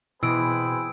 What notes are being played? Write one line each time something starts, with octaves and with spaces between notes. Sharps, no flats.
B2 E3 C4 G#4 B4 E6 D7